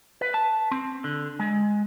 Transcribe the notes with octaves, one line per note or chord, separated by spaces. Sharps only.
B4
A5
C4
D3
G#3